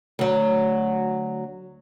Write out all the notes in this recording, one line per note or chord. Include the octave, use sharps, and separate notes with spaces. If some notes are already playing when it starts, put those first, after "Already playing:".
D2 F#3